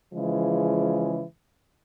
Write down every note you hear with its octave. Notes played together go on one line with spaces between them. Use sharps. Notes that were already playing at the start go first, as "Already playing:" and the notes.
C#3 E3 F3 G#3